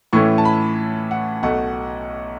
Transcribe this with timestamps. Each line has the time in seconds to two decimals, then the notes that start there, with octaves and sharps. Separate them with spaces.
0.13 A2 E3 A3 C#4 E4 C#6
0.38 A5
0.45 B5
1.11 F#5
1.43 B1 B2 A3 F#5